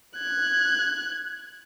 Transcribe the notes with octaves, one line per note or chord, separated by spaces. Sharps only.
F#6 G#6